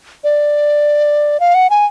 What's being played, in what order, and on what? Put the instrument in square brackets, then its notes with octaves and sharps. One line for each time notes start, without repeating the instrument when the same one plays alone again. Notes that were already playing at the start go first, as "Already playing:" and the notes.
[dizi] D5
F5
F#5
G#5